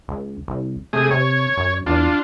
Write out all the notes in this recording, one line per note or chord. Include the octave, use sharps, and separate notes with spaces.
C#2
C2
C3 A3 G#4 D#6
C3 C#5
F#2
E2 D4 F4